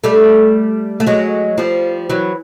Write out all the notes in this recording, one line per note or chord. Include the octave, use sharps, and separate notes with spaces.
G3 A3
A3
F#3 G#3
F3 G3
E3 F#3